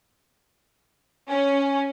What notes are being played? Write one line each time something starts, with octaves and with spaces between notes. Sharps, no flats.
C#4